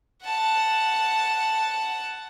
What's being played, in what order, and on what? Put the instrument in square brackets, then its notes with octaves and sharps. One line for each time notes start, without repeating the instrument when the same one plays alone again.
[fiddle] F#5 A5